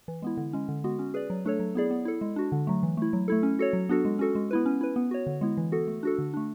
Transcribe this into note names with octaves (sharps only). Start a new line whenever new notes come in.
E3
G#3 B3 E4
D3
G#3 C#4
D3
G#3 B3 F#4
C#4
G#4 B4 D5
F#3
A3 D4 A4 C#5
F#3
B3 E4 G#4 D5
B3
E4 A4
G#3
D4 F#4
D3
F#3 A3
E3
A3 E4
F#3
A3 E4 A4
C#4
F#4 A4 C#5
F#3
B3 D4 F#4 A4
G#3
C#4 F#4 A4
G#3
B3 E4 B4
C#4
E4 B4
B3
F#4 C#5
D3
G#3 B3 E4
E3
B3 F#4 A4
A3
D4 F#4 A4
D3
A3 D4